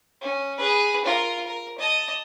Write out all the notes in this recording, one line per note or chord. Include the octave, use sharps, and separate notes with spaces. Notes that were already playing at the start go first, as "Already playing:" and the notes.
C#4
G#4 B4
F4 A#4
A#4
D#5 A5